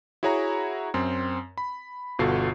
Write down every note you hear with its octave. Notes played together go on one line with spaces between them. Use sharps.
E4 F#4 G#4 C#5 F#5 A#5
F#2 C4 C6
B5
G1 B2 F4 F#4 A4 C7